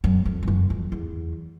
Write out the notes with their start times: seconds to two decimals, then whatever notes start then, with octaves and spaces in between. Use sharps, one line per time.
0.04 F#2
0.25 F2
0.43 G2
0.48 F#2
0.70 F2
0.92 E2